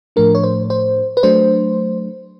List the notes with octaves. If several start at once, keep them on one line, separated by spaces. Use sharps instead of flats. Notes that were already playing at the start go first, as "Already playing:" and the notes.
A2 F3 A3 D4 A#4
C#5
C5
C5
B4
F#3 A3 D4 C5